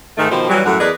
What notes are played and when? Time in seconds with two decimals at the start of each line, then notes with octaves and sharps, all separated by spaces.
0.17 G#2 D#3 A3
0.31 B2 D#3 F3 D#4 G4 C5
0.49 E3 F#3 G3
0.65 F#2 A2 A3 F#4 F#5
0.80 E2 G#4 A#4 B4 D5 D#5